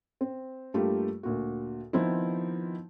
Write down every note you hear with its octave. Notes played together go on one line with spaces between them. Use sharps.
C4
G2 G3 A3 A#3 F4 G4
D2 A#2 F#4
D#3 F3 B3 C4 D#4 E4